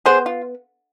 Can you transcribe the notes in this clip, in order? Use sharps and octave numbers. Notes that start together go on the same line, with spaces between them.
B3 G#4 C5
F4